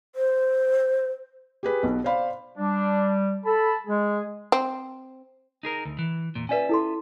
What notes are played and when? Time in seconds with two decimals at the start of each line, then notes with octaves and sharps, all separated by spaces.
0.15 C5
1.63 G4 G#4 B4
1.83 B1 B2
2.04 C5 D5 F5 B5
2.58 G3 D4
3.45 A4 A5 B5
3.87 G#3 G#4
4.52 C4
5.63 D#4 G#4 A#4
5.85 D2
5.99 E3
6.35 E2 A#2
6.49 C#4 F4 B4 D5 E5 G#5
6.69 E4 A4 C6